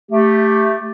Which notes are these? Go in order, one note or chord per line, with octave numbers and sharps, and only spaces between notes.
A3 G4